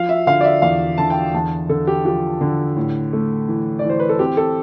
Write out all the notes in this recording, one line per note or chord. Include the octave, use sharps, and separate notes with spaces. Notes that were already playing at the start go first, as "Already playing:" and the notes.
Already playing: F3 F5
E5
D3 F5
D5
E5
E2 F5
D3 A5
G5
E2 A5
D3 A4
G4
F3 G4
D3
A2
A3
E3
D5
E3
C5
B4
A4
C4 G4
A4